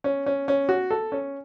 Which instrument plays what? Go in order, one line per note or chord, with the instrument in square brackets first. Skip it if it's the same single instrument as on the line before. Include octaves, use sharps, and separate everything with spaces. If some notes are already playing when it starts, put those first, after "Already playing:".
[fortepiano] C#4
C#4
C#4
F#4
A4
C#4